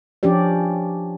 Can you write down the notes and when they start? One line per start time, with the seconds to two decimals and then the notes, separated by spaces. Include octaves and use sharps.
0.23 F3 C#4 D4 G4 D5